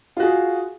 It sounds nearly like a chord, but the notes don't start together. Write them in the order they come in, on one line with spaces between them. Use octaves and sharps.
F4 F#4 G#4